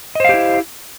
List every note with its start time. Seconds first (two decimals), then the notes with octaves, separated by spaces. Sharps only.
0.15 D#5
0.20 C5
0.25 F5
0.29 G4
0.34 E4